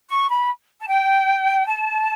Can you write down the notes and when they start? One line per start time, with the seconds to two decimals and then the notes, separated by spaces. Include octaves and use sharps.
0.09 C#6
0.29 B5
0.80 A5
0.88 G5
1.66 A5